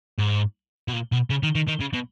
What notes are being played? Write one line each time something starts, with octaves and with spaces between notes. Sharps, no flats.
G#2
B2
A#2
B2
C#3
D#3
D#3
D#3
C#3
B2